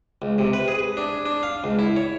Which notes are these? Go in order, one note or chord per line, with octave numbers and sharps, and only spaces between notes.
C#2
C3
B4
G#4
D4
D4
F5
C#2
E4
C#5